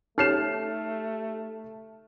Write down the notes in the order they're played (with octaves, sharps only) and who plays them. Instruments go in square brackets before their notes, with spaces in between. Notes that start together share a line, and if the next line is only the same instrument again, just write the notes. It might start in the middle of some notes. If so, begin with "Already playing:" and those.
[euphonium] A3 [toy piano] D#4 C#5 [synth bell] G4 A4 [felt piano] F6 C7 E7